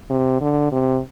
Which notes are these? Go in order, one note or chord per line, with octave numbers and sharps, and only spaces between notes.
C3
D3
C3